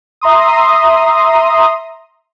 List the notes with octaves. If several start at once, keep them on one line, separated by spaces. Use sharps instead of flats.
E5 A#5 C6 D#6